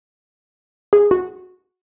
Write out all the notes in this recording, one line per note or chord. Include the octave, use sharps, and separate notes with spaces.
G#4
F#4